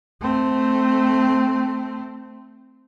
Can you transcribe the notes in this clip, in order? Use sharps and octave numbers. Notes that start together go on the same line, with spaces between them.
A3 C4